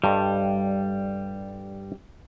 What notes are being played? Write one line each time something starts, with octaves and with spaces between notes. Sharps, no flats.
G2 G3 A4 D#5